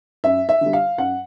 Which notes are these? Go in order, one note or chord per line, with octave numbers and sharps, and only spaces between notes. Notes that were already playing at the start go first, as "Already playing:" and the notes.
F#2 E5
E5
D3 G3
F5
F#2 F#5